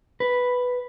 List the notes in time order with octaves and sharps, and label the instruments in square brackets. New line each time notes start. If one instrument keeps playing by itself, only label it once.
[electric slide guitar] B4